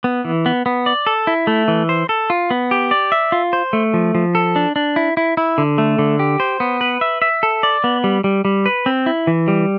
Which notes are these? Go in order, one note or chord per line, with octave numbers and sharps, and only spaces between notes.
B3
E3
B3
B3
D5
A4
E4
A3
E3
C5
A4
F4
B3
G4
D5
E5
F4
C5
A3
F3
F3
A4
D4
D4
E4
E4
E4
D3
A3
D3
G4
C5
B3
B4
E5
E5
A4
D5
B3
G3
G3
G3
B4
C4
E4
E3
G3